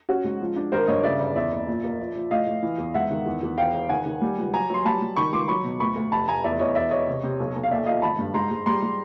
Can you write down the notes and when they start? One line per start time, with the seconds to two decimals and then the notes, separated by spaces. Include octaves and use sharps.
0.09 C#4 F#4
0.24 G#2
0.41 F3
0.56 D4
0.72 G#1 A#4 C5
0.87 G2 C#5 D#5
1.03 C#3 D5 E5
1.19 G1
1.35 E2 D5 E5
1.52 F#1
1.67 A#2
1.84 A#3
1.99 F3
2.16 F3
2.31 A2 D#5 F5
2.47 A2
2.63 E3
2.78 E2
2.94 G#2 E5 F#5
3.11 D#3
3.26 E2
3.43 E2
3.58 E1 F5 G5
3.74 E1
3.89 D#3 F#5 G#5
4.06 D#3
4.22 G3
4.38 C#2
4.54 F#3 G#5 A#5
4.70 F#3 C6
4.85 G3 A5 B5
5.01 G3
5.16 D#3 B5 C#6
5.32 C#2 C6 D6
5.48 F#3 B5 C#6
5.64 B2
5.80 D2 B5 C#6
5.96 D2
6.12 F1 A5 B5
6.28 F1 G#5 A#5
6.44 E2 D5 E5
6.59 E2 C#5 D#5
6.75 E1 D5 E5
6.91 E1 C#5 D#5
7.07 C3
7.23 C3
7.40 B1
7.56 B1
7.63 F5
7.71 D#2 D5 E5
7.86 F3 D#5 F5
8.02 G#1 A5 B5
8.19 G2
8.34 G#2 A#5 C6
8.51 G#2
8.66 G3 A#5 C6
8.83 G3